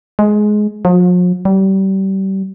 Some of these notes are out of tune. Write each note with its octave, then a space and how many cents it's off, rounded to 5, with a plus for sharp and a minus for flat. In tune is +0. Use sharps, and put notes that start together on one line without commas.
G#3 +15
F3 +45
G3 -30